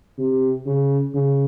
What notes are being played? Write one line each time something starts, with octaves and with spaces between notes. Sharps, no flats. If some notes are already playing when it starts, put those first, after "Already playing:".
C3
C#3
C#3